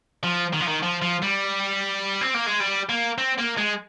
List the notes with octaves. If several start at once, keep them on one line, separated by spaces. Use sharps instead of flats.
F3
D#3
F3
D#3
F3
F3
G3
C4
A#3
G#3
G3
A#3
C4
A#3
G#3